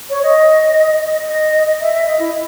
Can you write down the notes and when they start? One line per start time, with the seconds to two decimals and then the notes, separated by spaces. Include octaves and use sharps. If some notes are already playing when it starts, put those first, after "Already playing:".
0.10 C#5
0.23 D#5
1.28 D#5
1.80 E5
1.93 E5
2.07 D#5
2.19 E4